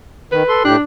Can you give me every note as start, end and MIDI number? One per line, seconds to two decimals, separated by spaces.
0.32 0.43 51
0.32 0.63 71
0.49 0.63 69
0.49 0.63 84
0.65 0.76 45
0.65 0.84 62
0.65 0.76 67
0.65 0.76 90